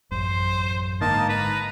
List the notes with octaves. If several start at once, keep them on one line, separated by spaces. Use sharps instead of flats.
A1 F#2 C5
G#2 D3 A#3 D#4 A5
B4 A#5